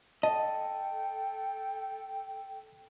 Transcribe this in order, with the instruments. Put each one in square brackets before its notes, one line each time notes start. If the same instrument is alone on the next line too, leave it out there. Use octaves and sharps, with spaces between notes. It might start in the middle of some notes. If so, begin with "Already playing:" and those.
[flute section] A4 G5 [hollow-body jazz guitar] D#5 [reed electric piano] A5